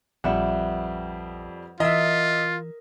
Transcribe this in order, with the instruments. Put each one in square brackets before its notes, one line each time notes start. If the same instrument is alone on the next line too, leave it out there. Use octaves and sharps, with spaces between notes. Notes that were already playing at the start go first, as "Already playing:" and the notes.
[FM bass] A#1 [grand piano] F2 G3 [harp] B4 E5 F#5
[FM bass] E3 [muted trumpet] F4 [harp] A#4 [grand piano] D#5 E5